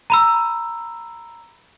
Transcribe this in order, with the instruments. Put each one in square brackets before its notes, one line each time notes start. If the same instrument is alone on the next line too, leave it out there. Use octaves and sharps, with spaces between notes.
[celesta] A#5 B5 E6